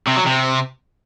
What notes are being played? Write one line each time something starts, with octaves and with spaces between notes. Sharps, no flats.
C3
F#3
C3